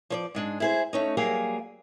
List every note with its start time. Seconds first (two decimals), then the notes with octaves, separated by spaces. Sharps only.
0.10 F3 C#5 D5
0.35 G#2 G#3 D4
0.60 E4 G#4 C5
0.93 A3 C#4 D#4
1.17 F#3 G3 A#3 G#4 F5